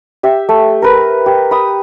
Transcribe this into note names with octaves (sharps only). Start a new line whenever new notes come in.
G4 E5
A3
A#4 B4
G4
B5 D#6